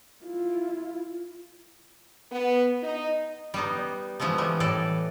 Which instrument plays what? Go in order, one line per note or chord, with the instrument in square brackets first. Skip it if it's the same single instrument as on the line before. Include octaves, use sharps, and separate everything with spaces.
[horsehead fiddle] E4 F4
[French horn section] B3
D#4
[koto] G3 B3 D#4
E3 F3 G#3 A3 B3
G3 G#3
A2 E3 A4 D5